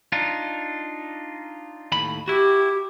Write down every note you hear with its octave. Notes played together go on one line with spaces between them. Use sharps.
D4 D#4 F4
D#2 A2 B5
E4 F#4 G4